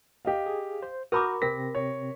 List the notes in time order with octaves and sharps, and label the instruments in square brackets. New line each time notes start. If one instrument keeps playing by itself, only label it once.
[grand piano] G4 D#5 F5
[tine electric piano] G#4
C5
[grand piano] F#4 A#5 [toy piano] A#4 B5 D6 [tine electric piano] D#6 F6 G6
[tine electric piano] C3 C4 A#6 [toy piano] A#4 [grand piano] B6
[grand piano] C#5